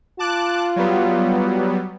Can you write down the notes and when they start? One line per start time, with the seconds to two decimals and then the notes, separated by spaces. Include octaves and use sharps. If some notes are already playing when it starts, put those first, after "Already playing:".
0.19 F4 A5 D6 F#6
0.76 F#3 G3 B3